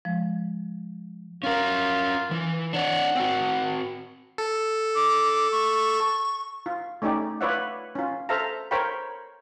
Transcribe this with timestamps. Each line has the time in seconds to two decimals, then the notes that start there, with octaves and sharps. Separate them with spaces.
0.05 F3 G#3
1.43 C#4 F4 A#4
2.31 E3
2.73 D4 C#5 D5 F#5
3.15 C4 F#4
4.38 A4
4.95 D6
5.52 C#6
6.66 F4
7.02 A3 C#4 D#4 G4 D5
7.41 F4 B4 C#5 D5 E5 F#5
7.95 C#4 F4
8.29 A4 C5 E5 F5 A5 A#5
8.71 A#4 C5 C#5 F5 G5 B5